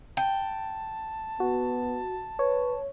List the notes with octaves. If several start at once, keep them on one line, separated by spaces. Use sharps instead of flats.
G5 A5
B3 F#4
B4 C#5